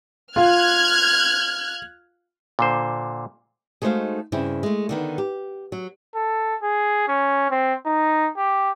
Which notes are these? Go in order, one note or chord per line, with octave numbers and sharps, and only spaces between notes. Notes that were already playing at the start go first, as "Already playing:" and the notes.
F4 F5 F6 F#6 G#6
A#2 D3 C5
G#3 A3 D#4 F#4 C5 F5
G2 C#3 C4 E4
G#3 A3
D3 D#3 B3
G4
F#3
A4
G#4
C#4
C4
D#4
G4